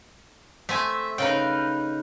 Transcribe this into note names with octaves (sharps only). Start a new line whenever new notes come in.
A3 C4 E5 G#5
C#3 D#4 B4 F5 G5